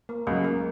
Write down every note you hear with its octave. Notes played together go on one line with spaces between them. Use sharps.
A#3
C#2 C#3 F#3 G#3
A#3